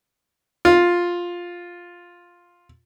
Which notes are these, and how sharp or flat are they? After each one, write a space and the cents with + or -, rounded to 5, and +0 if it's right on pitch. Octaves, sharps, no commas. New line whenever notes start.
F4 +5